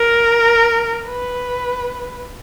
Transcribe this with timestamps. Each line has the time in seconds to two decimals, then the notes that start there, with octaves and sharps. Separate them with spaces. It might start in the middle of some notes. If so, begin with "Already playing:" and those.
Already playing: A#4
1.07 B4